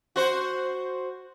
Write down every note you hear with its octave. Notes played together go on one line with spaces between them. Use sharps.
F#4 C5